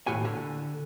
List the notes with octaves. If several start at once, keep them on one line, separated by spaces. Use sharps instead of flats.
D#2 A2 F#4 G#5
D3